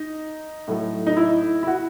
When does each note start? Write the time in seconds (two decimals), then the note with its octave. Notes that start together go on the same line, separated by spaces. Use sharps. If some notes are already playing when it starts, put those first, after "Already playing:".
Already playing: D#4
0.68 A2 F#3 A3
1.07 D#4
1.17 E4
1.63 E4
1.67 F#4